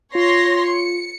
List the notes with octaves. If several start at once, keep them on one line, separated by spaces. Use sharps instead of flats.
F4 C#5 C6 A#6
C#7